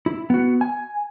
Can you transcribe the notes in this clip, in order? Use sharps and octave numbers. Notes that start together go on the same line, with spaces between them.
E4
B3 F#4
G#5